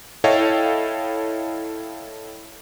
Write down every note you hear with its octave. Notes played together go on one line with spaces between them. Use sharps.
E4 A4 C#5 D#5 F5 G5